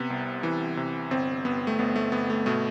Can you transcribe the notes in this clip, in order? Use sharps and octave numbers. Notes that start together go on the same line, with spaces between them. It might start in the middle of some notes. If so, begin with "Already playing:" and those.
Already playing: C3 B3
C2
E3
C3
G1 C4
G1 B3
A3
G1 B3
A3
G1 B3
A3
B2 A3